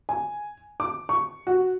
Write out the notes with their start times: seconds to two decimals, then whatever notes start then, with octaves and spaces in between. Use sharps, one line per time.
0.09 G#5
0.80 D6
1.09 C#6
1.47 F#4